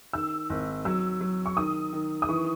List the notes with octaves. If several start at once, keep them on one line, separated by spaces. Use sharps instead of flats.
D#3 E6
G#1
F#3 E6
F#3
C#6
D#3 D#6
D#3
D#6
E3 C#6